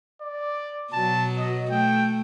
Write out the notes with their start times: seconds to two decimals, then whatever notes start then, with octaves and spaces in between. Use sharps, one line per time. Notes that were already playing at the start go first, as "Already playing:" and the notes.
0.21 D5
0.93 B2 F#3 A5
1.38 D#5
1.71 A3 G5